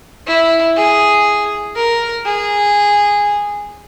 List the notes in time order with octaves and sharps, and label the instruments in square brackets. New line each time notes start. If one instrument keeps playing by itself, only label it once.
[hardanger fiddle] E4
G#4
A#4
G#4